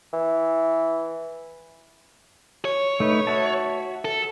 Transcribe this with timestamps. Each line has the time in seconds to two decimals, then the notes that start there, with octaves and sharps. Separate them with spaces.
0.13 E3
2.65 C#5
3.00 A3 D#4 B4
3.27 F#4 E5 A5
4.05 A4